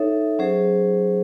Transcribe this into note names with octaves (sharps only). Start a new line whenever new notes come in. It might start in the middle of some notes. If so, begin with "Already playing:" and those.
Already playing: D#4 A4 C#5 E5
F#3 C#4 G#4 C5